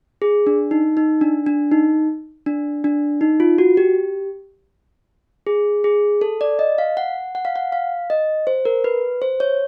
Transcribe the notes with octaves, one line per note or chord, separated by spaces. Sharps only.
G#4
D4
D#4
D#4
D4
D4
D#4
D4
D4
D#4
F4
F#4
G4
G#4
G#4
A4
D5
D#5
F5
F#5
F#5
F5
F#5
F5
D#5
C5
A#4
B4
C5
C#5